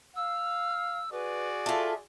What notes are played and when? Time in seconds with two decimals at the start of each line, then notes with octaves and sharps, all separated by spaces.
0.16 F5 E6
1.12 F#4 G#4 B4 D5
1.66 F4 A4 E5